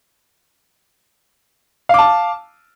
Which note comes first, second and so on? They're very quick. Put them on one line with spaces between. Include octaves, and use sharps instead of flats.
F5 D6 A5